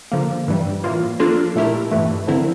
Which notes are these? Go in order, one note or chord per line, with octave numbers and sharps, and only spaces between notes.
D3 F3 A#3
G2 E3 G3
A2 E3 A#3 F4
F3 A#3 D4 F4 A4
A#2 A3 E4 G4 A#4
G2 E3 A3
D3 F3 C4 E4 A#4